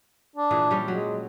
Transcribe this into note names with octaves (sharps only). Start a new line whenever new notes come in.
D4
A#2 E3 G#4
G3 C#4
F#3 G#3